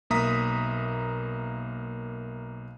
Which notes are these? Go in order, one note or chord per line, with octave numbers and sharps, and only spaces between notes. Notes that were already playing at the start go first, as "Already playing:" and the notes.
B1 A#3 E5 A#5 D#6 B6